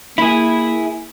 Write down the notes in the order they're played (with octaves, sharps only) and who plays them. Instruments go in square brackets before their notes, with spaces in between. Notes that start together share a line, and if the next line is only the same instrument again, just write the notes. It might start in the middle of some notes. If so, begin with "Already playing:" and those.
[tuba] A#3 [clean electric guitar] E4 G#4